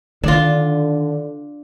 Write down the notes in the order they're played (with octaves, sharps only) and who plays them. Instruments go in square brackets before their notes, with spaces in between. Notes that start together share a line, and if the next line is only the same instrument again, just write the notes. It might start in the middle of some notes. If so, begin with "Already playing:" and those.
[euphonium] D3 [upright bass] D#3 [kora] D4 F4